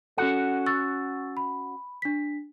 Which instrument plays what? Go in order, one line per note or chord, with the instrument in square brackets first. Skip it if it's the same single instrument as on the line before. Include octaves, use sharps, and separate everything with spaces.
[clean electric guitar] C#4 F#4 F#5 [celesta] A4
[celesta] C#6 E6 A6
B5
D4 B6